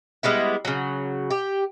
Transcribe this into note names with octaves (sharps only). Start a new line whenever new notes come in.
G3 G#3 B3 E4
C#3 F#3
G4